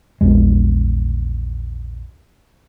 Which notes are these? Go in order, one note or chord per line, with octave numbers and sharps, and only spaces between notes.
A#1 E2 G#3